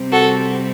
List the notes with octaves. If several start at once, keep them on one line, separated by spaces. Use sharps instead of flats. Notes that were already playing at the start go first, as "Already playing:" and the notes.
Already playing: C3 G3 C4
F#4 A4